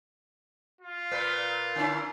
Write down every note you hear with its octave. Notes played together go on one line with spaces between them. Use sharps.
F4
A#2 B4
D3 C#4 E4